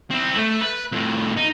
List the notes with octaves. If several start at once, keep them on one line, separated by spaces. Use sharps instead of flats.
C4 E4
A3
B4
F2 A2
D#4